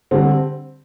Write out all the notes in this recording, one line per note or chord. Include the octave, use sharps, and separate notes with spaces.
D3 G3 C4